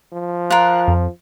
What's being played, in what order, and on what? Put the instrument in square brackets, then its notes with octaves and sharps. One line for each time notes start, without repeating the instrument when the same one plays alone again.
[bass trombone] F3
[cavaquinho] F4 A#4 [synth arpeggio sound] F#6
[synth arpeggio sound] F2